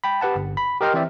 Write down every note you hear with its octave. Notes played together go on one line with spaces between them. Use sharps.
G5 B5
G4 B4 F#5 A5
G1
B5
G4 A#4 D#5 G5 C6 F6
E3 C4 C5 D5 E5